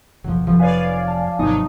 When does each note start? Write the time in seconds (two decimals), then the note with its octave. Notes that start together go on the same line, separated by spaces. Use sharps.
0.24 F#1 B1 F3 F#3
0.47 F1 F3
0.60 B4 C#5 D5 F5 G#5
0.81 C7 D7
1.07 A5
1.39 G#1 C3 F#3 B3 D#4 D#5 C#6